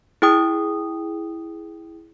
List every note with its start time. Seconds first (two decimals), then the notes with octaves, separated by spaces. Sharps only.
0.22 E4 G#4 G5 D#6